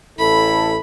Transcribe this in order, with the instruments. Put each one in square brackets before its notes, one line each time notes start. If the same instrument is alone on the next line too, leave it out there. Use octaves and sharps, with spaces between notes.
[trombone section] A1 E4 A4 [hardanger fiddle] B5